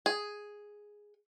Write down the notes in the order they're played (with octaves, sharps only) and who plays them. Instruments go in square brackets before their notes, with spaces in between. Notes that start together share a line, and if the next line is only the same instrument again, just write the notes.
[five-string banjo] G#4